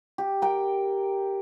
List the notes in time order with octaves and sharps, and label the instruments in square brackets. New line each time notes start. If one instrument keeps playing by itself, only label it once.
[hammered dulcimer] G4
A#4 G5